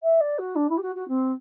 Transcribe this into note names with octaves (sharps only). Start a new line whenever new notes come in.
E5
D5
F#4
D4
E4
G4
F#4
F#4
C4